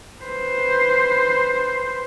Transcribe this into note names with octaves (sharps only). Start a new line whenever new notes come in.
B4 C5